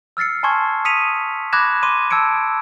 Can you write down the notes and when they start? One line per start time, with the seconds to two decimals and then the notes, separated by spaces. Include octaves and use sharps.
0.17 E6 F6 A6 C7 C#7
0.43 G#5 A5 C6 C#6 G#6
0.85 D#6 B6 C#7 D#7 F7
1.53 B5 D6 F#6 G#6 A#6 E7
1.83 C6 D6 D#7
2.11 A5 E6 G#6 C#7 D7